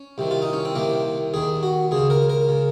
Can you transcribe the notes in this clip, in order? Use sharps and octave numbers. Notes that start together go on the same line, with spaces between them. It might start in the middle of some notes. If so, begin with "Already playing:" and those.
Already playing: C#4
C2 C3 D#3
F4
D#4
C#4
C4
C2 C3 D#3 A#3
D#2 D#3 G#4
F#4
C#2 C#3 G#4
A#4
A#4
C#3